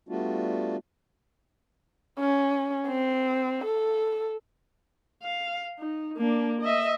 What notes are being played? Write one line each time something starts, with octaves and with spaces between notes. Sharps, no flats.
G3 A3 B3 D4 F4 F#4
C#4
C4
A4
F5
D#4
A#3 D4
D#5 E5